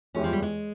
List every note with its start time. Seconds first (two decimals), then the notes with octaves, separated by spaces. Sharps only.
0.15 E2 E3 G#3 C#4 E4 G4
0.24 F3
0.33 G3
0.43 G#3